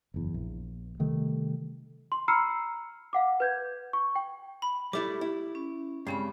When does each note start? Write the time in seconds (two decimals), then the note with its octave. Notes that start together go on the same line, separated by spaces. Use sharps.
0.14 F#1 E2
0.34 A#1
0.99 C3 D#3 G3 A3
2.12 C6
2.28 A#5 B5 E6 F6 C7 C#7
3.13 F5 F#5 D6
3.40 B4 G6 G#6
3.93 C#6
4.16 G5
4.62 B5
4.93 G3 A3 E4 G4 D6
5.21 E4
5.55 C#4
6.07 G2 C#3 G#3 C4 B5